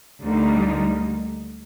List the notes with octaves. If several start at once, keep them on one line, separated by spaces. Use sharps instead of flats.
D2 D3 G3 A#3 D#4